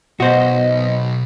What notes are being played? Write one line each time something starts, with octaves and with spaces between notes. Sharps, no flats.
B1 B3 F#4 C5 D#5